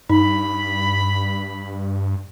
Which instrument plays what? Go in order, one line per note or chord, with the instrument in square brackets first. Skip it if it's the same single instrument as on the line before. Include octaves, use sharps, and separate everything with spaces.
[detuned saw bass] G2 [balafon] D#4 [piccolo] B5